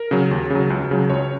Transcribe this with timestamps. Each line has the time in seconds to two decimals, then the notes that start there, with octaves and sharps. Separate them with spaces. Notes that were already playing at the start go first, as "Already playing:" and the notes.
Already playing: A#4
0.11 C#3 F#3
0.31 D#2
0.50 C#3 F#3
0.70 C#2
0.91 C#3 F#3
1.10 C#2 C#5